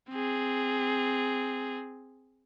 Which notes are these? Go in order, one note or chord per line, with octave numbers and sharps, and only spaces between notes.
C4 G#4